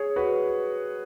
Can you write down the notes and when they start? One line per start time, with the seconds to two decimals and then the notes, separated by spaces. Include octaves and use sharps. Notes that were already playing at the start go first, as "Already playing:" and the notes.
Already playing: G#4 C#5
0.16 F#4 B4